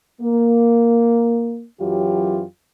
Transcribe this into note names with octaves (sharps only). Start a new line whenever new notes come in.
A#3
F#2 E3 F#3 F4 G4